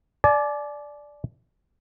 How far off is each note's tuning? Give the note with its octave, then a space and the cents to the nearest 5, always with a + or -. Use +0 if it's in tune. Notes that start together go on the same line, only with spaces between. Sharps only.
D5 +0 G#5 +45